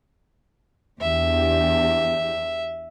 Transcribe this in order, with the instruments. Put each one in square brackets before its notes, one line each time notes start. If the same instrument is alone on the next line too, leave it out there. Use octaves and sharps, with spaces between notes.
[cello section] E2 D4 G4 [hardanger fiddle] E5